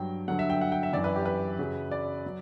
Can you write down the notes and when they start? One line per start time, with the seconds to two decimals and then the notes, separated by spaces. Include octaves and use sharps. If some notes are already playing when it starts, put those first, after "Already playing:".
Already playing: G2 F#3 G5
0.28 G2 D3 F#3 F#5
0.39 E5
0.50 G5
0.61 F#5
0.72 G5
0.83 E5
0.93 F#2 E3 D5
1.04 B4
1.16 G4
1.25 B4
1.59 F#2 C#3 F#3
1.91 D5
2.26 F#3